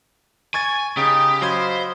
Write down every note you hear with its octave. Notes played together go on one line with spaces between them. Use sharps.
G#5 C#6 G#6 A6
C#3 D#4 G4 D#6
F#3 F4 C5 D#5 B5 D#6 G#6